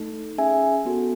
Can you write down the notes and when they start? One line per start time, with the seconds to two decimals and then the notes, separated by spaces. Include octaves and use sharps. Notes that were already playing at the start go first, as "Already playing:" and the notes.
Already playing: A3 D#4 A4
0.38 C#4 G#4 E5 G#5
0.85 B3 F#4 A4